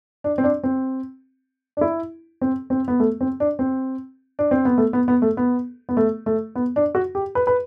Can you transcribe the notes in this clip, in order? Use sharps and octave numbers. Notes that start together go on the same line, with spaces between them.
D4
C4
D4
C4
D4
E4
C4
C4
B3
A3
C4
D4
C4
D4
C4
B3
A3
B3
B3
A3
B3
B3
A3
A3
B3
D4
F#4
G4
B4
B4